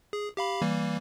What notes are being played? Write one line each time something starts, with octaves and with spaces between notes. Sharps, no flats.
G#4
G4 F5 B5
E3 G3 A#3